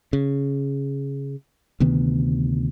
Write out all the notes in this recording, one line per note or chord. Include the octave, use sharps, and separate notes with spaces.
C#3
D2 C3 D#3 B3